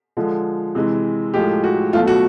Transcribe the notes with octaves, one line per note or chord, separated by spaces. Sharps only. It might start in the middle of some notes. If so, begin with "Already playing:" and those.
D3 F3 G#3
C3 E3 G#3
A2 F3 G#3 G4
F#4
B2 F#3 A3 F4
F#4